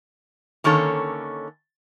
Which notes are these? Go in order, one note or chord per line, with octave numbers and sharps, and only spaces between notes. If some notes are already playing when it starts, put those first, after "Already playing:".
D3 D#3 A#3 C#4 A4 C#5